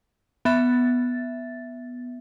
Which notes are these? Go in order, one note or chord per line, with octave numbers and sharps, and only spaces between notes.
B3 E5 A6